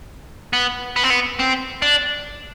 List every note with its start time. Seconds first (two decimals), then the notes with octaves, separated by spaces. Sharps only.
0.53 B3
0.96 B3
1.04 C4
1.10 B3
1.39 C4
1.82 D4